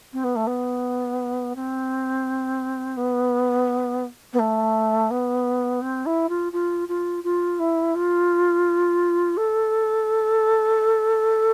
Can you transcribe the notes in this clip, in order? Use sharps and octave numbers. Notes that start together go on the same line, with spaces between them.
C4
B3
A3
B3
C4
B3
B3
A3
B3
C4
E4
F4
F4
F4
F4
E4
F4
A4